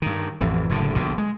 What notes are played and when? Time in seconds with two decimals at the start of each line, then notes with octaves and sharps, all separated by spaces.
0.02 G2 D#3
0.41 A1 F2 E3
0.69 F#1 A2 D3
0.95 A#1 B2 D3
1.18 G#3